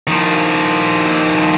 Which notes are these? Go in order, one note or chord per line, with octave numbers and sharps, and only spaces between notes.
D#3 F3